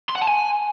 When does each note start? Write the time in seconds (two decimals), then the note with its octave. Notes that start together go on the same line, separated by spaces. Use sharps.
0.09 C6
0.15 F#5
0.21 A5
0.28 G#5